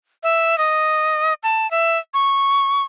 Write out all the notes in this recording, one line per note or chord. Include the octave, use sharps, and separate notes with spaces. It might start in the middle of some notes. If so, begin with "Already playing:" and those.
E5
D#5
A5
E5
C#6